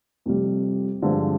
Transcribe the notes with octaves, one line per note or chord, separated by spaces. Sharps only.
F2 C3 G3
G2 D3 F3 G#3 C4